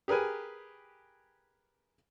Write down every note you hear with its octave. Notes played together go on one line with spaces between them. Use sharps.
G4 G#4 A#4 B4 G#5